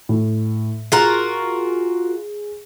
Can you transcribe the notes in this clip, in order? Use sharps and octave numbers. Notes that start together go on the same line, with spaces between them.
A2
F4 F#4 G#4 A#4